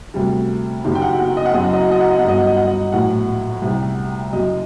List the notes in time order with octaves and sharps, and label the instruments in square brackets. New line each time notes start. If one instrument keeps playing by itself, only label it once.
[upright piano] D2 C3 G3
F#1 F#2 D#3 F#3 G4
G5
F#5
F#5
D#5
F#5
F#1 F#2 F#3 D#5
F#5
D#5
F#5
D#5
F#5
D#5
F#5
G1 G2 F#3 D#5
F#5
D#5
F#5
D#5
A#1 A2 F#3 F#5
C2 C3 G3
F#1 F#2 F#3 D#5